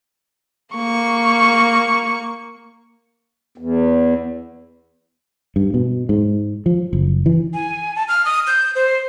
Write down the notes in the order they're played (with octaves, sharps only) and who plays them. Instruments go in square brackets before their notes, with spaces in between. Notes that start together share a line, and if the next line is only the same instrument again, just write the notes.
[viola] A#3 C#6
[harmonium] E2
[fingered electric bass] G2
B2
G#2
F3
F#1
E3
[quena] G#5
A5
F6
D#6
G6
C5